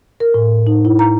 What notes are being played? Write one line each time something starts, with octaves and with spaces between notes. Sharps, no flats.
A#4
A2
D#4
E4
A#5